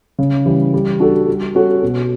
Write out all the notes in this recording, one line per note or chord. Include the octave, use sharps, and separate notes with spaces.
C#3
E3 G3
G3
D4 F#4 A4
G3
C#4 F#4 A4
B2